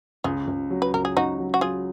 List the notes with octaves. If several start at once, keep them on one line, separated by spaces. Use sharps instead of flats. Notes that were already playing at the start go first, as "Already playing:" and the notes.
C#2 F4 G#4
C#2
F#3
B4
C#2 A#4
G#4
C#2 D#4 F#4
F#3
F#4
F#3 F4 G#4